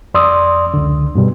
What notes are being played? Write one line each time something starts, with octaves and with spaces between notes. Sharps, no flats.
F2 D5 C6 D#6 E6
C#2 D3
G2 B2 G3 B3